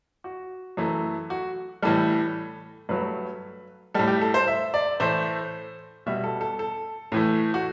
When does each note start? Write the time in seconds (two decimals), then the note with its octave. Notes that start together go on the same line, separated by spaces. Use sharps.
0.24 F#4
0.77 F#2 E3 A3
1.30 F#4
1.82 A2 E3 G3 A4
2.89 G2 F#3 A3 B4
3.94 A2 G3 A4
4.07 G4
4.21 A4
4.34 C5
4.48 E5
4.74 D5
5.00 A2 E3 A3 C5
6.06 B2 G3 E5
6.24 A4
6.41 A4
6.59 A4
7.12 A2 E3 A3
7.54 F#4